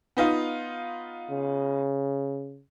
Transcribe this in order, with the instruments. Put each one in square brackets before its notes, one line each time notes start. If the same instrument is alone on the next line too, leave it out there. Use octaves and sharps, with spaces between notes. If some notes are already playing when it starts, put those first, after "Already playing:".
[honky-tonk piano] B3 D#4 F4
[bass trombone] C#3